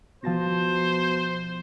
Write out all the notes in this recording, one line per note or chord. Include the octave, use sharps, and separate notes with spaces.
B2 F3 C5 A5 A#6